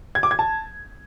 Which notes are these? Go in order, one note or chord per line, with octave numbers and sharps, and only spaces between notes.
G#6
D6
G#6
A5